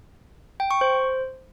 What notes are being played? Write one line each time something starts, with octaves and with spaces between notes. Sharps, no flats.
G5
C#6
C5